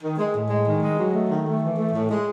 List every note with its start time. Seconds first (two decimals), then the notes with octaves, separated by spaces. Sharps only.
0.02 D#3
0.18 G#3
0.35 A2
0.50 G#3
0.66 D#3
0.82 G#3
0.98 F#3
1.14 A3
1.30 D#3
1.46 A3
1.62 E3
1.78 A3
1.94 A2
2.10 G#3